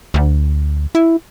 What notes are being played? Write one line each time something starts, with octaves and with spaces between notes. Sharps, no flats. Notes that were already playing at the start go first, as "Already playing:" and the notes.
D2
E4